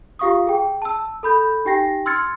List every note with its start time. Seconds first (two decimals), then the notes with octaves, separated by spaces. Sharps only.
0.19 F4 G4 F5 C#6 D#6
0.47 G#4 G5
0.82 A5 E6
1.23 A4 B5 G6
1.65 D#4 G4 G5 A#6 C7
2.06 C6 E6 F6 G#6 A6 C#7